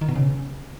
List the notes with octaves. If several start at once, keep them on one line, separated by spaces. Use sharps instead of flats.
D#3
B2
C#3